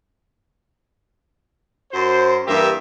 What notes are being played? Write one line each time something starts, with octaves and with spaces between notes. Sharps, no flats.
F#2 F#4 C5
G2 E3 A#3 G4 E5